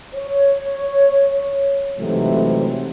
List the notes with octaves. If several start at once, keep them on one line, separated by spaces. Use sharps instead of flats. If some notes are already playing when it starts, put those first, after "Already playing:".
C#5
G#2 C3 E3 F#3 A3